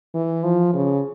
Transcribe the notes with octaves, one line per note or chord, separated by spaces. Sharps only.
E3
F3
C#3